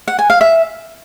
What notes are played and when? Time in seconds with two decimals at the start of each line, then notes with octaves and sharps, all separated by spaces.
0.08 F#5
0.19 G#5
0.30 F5
0.41 E5